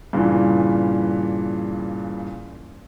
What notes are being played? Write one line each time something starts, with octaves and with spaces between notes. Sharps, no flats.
G2 A#2 C#3 E3